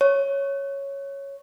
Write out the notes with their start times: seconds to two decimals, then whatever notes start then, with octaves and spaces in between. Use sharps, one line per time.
0.01 C#5